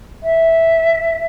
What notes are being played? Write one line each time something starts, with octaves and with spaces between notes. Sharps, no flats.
E5